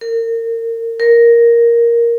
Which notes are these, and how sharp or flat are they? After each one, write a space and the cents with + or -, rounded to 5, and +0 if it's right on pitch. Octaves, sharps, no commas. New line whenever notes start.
A#4 -30
A#4 +5